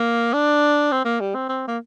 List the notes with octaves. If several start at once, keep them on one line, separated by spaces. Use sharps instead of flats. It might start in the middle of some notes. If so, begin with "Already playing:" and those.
Already playing: A#3
D4
C4
A#3
G3
C4
C4
A#3